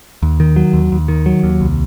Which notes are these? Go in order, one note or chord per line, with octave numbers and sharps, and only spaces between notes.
D#2
D#3
F#3
D#2
D#2
D#3
F#3
D#2
C2